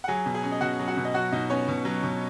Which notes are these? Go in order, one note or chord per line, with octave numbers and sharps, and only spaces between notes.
F#5
F#3 G#4 G#5
B2
G#4 G#5
C#4
D#5
B2 F#4 F#5
F#3
F#4 F#5
B2
D#5
F#3 F#4 F#5
B2 D#4 D#5
B3 C#4 C#5
B2
F#3
B2